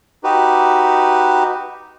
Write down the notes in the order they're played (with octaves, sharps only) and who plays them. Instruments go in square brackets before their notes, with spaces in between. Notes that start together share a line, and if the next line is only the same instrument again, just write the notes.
[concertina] D#4 F#4 G4 B4